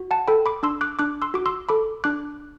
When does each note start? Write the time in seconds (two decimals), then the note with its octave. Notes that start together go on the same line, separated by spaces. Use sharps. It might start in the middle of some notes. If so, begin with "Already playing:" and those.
Already playing: F#4
0.11 F#5 A5
0.28 A4 G5 B5
0.46 B5 D6
0.63 D4 C6 E6
0.81 D6 F#6
0.99 D4 D6 F#6
1.22 C6 E6
1.34 F#4 D6
1.46 C6 E6
1.69 A4 B5 D6
2.04 D4 D6 F#6